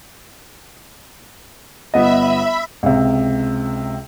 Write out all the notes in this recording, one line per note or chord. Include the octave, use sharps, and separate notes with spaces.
G1 B3 D#5 E5 B5
C#2 C3